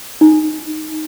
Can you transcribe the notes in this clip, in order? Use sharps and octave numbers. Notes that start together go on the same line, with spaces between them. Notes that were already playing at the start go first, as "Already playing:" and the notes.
D#4